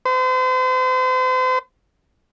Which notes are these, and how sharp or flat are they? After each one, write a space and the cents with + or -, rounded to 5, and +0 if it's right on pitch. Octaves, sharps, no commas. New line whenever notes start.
C5 -40